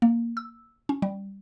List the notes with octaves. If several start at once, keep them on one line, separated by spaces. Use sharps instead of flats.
A#3
E6
C#4
G3